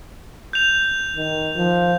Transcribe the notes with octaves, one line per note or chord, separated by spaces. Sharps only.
G6 F7
D#3
F3